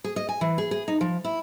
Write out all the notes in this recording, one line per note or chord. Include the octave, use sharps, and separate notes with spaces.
G#4
D#5
G#5
E3
G#4
G#4
D#4
F3
E4